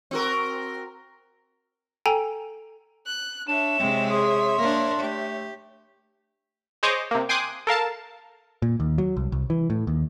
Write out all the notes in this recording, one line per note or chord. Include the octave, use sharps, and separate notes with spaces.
C4 F#4 A#4
A4 G5 G#5 A#5
F#6
D4 C#5 E5 E7
C3 G#3 C4
G#4 C6
A#3 D4 A#4
A3 G4
G#4 C5 C#5 D#5 D6
C3 A#3
G5 G#5 C6 D6 D#6 F#6
A4 A#4 F5 A5
A#2
D#2
F#3
C2
C2
E3
A2
D#2